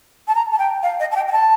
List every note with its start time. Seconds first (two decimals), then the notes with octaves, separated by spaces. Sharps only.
0.28 A5
0.35 A#5
0.51 A5
0.59 G5
0.83 F5
1.00 D#5
1.12 A5
1.16 G5
1.28 G5
1.32 A5